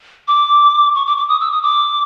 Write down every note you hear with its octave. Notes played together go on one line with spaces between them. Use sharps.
D6
C#6
D6
D6
D#6
E6
D#6
D6